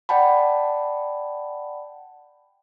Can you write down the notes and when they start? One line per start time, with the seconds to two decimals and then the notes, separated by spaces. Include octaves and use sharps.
0.09 D5 F#5 G5 A5 B5